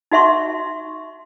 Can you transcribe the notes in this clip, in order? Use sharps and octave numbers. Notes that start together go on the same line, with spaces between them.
D#4 F#4 E5 C6 C#6